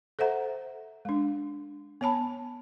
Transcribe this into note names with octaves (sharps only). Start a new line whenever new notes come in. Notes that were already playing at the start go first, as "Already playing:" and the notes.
A4 C5 E5 F#5 A#5
G#3 D4
B3 C#5 G#5 A5 B5